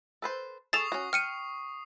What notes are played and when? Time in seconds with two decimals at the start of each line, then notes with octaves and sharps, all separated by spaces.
0.22 A4 B4 C5
0.73 G#4 A4 C#6 D#6 A6 C7 E7 F7
0.92 C#4 F#4
1.13 G5 F6 C#7 D#7